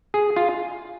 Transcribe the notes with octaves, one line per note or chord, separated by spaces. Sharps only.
G#4
F4